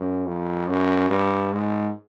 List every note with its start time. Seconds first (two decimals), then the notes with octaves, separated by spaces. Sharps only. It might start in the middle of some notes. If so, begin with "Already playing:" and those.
Already playing: F#2
0.26 F2
0.68 F#2
1.10 G2
1.52 G#2